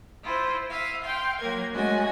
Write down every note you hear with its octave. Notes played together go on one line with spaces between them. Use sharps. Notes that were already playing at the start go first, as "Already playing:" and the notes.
E4 F4 C5
E5 F5 D#6
F5 G5 C6
F#3 A#3 A#4 G#6
G#3 A3 C#4 F#4 D#5 G#5